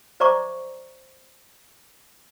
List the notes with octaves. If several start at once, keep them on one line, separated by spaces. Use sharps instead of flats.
C5 D5 E5 A#5 C#6 D6